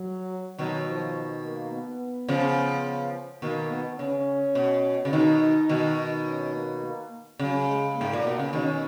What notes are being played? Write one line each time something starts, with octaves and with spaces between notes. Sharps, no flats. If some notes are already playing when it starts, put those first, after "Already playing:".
Already playing: F#3
B2 D#3 F#3
F3
A#3
B3
C#3 F3
B2 D#3 A#3
B3
C#3 C#4
B2
C#3
B2 D#3 D#4
B2 D#3
C#4
A#3
A#3
C#3 F#3
G#3
G#2 A#3
A#2
B2
C#3
B2 D#3 C#4